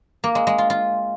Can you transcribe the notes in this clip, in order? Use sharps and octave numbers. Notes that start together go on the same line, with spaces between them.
A#3
G#3
G#3
F4
F4